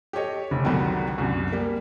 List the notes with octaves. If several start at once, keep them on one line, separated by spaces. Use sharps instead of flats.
G4 A4 C#5 D#5
F1
C2 D3 D#3 F#3 G3 B3
C2 F#2
G3 A#3